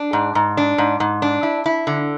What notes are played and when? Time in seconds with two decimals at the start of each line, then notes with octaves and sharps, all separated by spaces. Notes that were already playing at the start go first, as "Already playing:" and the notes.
Already playing: D4
0.13 G#2
0.35 G#2
0.57 D4
0.78 G#2
1.00 G#2
1.22 D4
1.43 E4
1.66 E4
1.87 D3